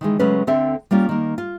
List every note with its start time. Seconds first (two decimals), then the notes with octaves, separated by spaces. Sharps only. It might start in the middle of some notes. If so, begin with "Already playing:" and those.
0.01 D#3 E3 G#3
0.19 C#3 F#3 G#3 A3 C#4 B4
0.47 D2 D3 C4 A4 E5
0.91 G3 A#3 C#4 F4
1.09 D#3 A#3
1.38 F4